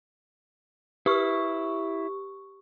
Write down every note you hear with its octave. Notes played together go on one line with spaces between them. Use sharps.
E4 G4 C#6